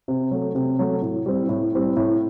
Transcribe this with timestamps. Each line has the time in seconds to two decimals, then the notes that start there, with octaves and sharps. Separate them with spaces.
0.08 C3
0.31 F#3 A3
0.55 C3
0.79 F#3 A3
1.02 A2
1.26 G3 C4 E4
1.49 A2
1.73 G3 C4 E4
1.97 A2